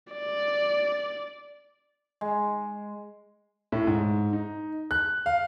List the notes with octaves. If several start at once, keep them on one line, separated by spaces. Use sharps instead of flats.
D5
G#3
A2
G#2
D#4
F#6
F5